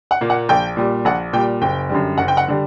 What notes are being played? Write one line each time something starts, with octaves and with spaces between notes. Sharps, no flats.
F#5
A#2 A#3
F#5
A#1 G5
A#2 G3
A#1 F#5
A#2 G3 G5
F#1 G5
F#2 D3 G3
F#1 F#5
G5
F#5
D3 G3